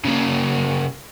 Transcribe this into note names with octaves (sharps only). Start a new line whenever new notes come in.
C#3 A#3